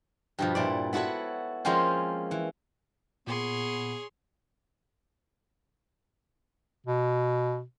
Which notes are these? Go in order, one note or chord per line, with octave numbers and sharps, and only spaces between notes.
G2 B2 F3
A#2 E4 D5
B3 E4 F#4 A4 C#5
F3 G#3 A#3 C4 C#4 C5
E3
A#2 B3 G#4 C#5 C6
B2